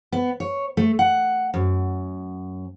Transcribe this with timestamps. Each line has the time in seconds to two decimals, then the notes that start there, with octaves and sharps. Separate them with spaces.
0.12 B3
0.40 C#5
0.77 A3
0.99 F#5
1.54 F#2